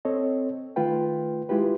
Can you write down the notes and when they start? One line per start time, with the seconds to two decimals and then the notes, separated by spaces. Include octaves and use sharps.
0.05 C4 A4 C#5 D#5
0.76 D#3 A3 F4 B4 G5
1.49 G#3 E4 F4 G4 B4